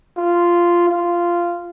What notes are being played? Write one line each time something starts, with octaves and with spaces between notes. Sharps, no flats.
F4
F4